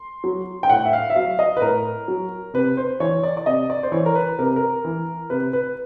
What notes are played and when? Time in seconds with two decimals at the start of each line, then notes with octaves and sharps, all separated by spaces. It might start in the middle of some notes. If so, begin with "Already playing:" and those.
Already playing: C6
0.24 F#3
0.63 G5
0.70 A2 F#5
0.85 E5
0.93 F5
1.10 E5
1.16 F#3 F5
1.39 D#5
1.57 B4
1.62 A2 A#4
2.08 F#3
2.54 C3 B4
2.77 C5
3.00 E3 C#5
3.23 D5
3.37 D5
3.46 C3 D#5
3.70 D5
3.83 C5
3.92 E3 C#5
4.06 A#4
4.15 B4
4.39 C3 A#4
4.56 A#4
4.85 E3
5.30 C3 B4
5.53 B4